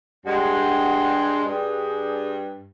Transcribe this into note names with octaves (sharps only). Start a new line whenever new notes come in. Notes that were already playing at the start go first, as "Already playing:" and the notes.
G2 G#3 F#5
G2 G#4